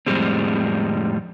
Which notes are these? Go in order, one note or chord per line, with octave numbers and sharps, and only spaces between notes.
F2 A2 G3 G#3 C4